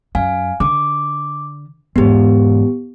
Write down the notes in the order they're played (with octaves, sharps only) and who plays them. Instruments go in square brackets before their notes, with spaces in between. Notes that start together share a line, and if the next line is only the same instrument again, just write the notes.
[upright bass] F#2 [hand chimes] F5 G#5
[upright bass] D3 [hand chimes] D6
[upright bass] E2 G#2 [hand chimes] B3 G4